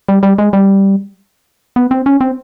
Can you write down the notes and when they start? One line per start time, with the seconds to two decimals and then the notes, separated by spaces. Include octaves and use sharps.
0.09 G3
0.23 G3
0.38 G#3
0.53 G3
1.76 B3
1.91 C4
2.06 C#4
2.21 C4